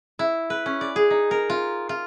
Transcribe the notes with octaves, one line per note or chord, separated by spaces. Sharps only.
E4
B4
C#4
D5
G#4
D#4
A#4
F4
F4